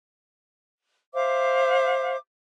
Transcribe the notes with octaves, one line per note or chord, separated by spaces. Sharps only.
C5 E5 F5 D6